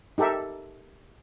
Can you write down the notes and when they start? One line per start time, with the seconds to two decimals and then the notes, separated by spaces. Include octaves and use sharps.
0.18 D#4 G4 A4 A#4 E5